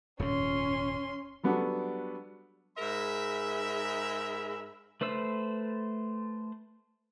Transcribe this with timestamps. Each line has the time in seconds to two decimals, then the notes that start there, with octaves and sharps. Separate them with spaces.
0.19 D#1 F2 G#2 C#4 C6
1.43 F#3 G3 B3 D4 F#4 A4
2.78 G#2 G#4 A#4 E5 B5
5.01 A3 B4 C5 E6